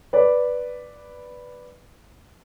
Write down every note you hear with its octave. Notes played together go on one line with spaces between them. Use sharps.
B4 D5